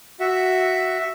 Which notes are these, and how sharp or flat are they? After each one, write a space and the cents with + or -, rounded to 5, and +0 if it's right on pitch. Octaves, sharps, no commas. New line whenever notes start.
F#4 +0 E5 +0